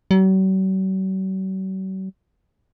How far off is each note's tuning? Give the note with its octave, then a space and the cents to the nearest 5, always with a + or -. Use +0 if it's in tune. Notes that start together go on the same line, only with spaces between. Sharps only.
F#3 +45